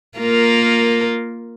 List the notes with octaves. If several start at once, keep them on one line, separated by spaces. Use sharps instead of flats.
A#3 F4 A#4